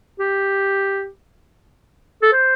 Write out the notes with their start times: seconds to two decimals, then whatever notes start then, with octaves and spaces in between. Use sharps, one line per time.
0.19 G4
2.22 A4
2.33 C5